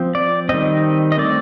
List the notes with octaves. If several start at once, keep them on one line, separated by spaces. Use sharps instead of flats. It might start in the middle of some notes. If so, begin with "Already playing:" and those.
Already playing: F3 C4
D5
D#3 G3 C4 D#5
D#5
D3 A3 C4 D5